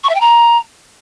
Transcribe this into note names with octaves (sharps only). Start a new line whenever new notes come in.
C#6
E5
G5
A#5